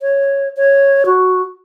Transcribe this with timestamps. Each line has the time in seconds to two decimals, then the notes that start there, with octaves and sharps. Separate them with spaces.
0.02 C#5
0.57 C#5
1.06 F#4